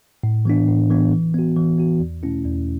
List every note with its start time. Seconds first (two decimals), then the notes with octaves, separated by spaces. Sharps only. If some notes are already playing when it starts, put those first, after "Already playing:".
0.23 A2
0.45 E3 B3 D4
0.68 A2
0.90 E3 B3 D4
1.12 E3
1.34 B3 F#4
1.56 E3
1.78 B3 F#4
2.00 E2
2.23 B2 A3 C#4 E4
2.45 E2